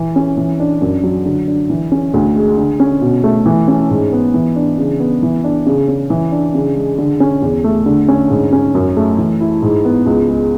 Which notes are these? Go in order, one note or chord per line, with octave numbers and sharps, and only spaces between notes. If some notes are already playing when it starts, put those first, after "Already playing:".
Already playing: E3
C#4
E3
D4
F#2
F#3
D3
D4
E3
C#4
D2
G#3
D3
C#4
B2
A3
E3
C#4
G#2
B3
E3
D4
C#3
B3
E3
D4
C#3
C#4
E3
D4
C#3
G#3
D3
C#4
E2
A3
D3
C#4
G#2
C#4
F#2
A3
E3
E4
G#2
B3
C#2
G#3